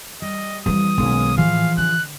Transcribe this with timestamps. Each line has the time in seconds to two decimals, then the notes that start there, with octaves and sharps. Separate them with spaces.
0.22 G3 D#5
0.66 F2 E3 G3 D#6
0.98 B1 D#3 G#3 A#3 C#4
1.38 A2 E3 F3 G#4 F5
1.78 D3 F#6